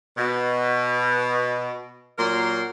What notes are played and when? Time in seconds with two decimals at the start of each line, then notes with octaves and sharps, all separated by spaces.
0.17 B2
2.19 A#2 F#3 A#4 C6